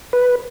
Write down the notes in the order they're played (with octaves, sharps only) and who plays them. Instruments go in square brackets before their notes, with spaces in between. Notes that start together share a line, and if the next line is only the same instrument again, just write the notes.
[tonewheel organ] B4